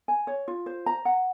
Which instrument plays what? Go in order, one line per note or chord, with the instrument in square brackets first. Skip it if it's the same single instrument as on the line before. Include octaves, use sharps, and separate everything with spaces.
[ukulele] G#5
C#5
F4
C5
A#5
F#5